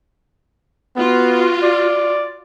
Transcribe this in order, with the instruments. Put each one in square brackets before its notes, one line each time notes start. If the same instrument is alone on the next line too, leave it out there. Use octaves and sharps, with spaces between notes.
[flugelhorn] B3 [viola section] F4 F#4
[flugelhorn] D5